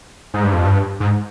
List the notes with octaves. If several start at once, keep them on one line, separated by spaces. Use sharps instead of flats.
G#2
G2
F2
G2
G#2